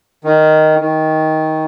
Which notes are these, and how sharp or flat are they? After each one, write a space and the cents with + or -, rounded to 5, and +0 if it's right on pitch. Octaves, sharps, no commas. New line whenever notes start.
D#3 +0
D#3 +15